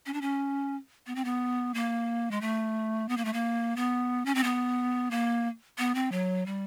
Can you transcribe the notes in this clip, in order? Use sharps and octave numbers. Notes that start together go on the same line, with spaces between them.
C#4
D4
C#4
B3
C4
B3
A#3
G#3
A3
B3
A#3
A3
A#3
B3
C#4
C4
B3
A#3
B3
C4
F#3
G3